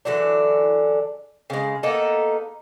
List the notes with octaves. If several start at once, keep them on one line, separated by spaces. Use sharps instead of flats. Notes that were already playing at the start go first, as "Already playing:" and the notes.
D3 E3 F#3 D4
C#3 G#3
A#3 B3 D#4 A4